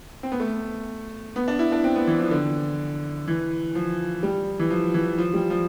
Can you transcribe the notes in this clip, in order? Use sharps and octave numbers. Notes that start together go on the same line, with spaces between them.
C4
B3
A3
B3
D4
E4
D4
C4
B3
E3
F3
D3
E3
F3
G3
E3
F3
E3
F3
G3
F3